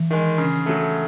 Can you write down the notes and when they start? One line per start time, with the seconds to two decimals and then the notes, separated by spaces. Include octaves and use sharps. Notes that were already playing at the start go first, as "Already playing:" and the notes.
Already playing: E3
0.11 D#3 G#3
0.38 C#3
0.66 F#3 A3